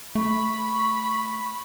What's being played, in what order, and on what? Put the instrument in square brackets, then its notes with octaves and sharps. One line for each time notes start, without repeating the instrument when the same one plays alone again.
[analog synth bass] A3 [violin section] B5 [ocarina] C#6